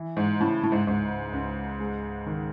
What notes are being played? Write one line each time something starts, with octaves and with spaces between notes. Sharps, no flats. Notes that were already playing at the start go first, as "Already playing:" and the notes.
Already playing: E3
G#2
A2 C#3
A2
G#2
C#2 G#2
C#2
G#3
D#3